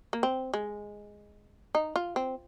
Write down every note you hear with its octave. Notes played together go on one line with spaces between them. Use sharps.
A#3
C4
G#3
D#4
F4
C4